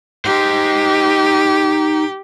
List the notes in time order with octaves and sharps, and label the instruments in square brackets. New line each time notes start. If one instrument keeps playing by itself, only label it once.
[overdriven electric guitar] D#4 C5 [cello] G4